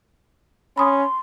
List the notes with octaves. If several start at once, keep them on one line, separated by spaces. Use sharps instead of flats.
C#4 B5 C6 D#6